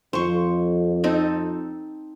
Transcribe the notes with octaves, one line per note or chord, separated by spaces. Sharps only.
F2 C5 C#6
C4 D#4 A4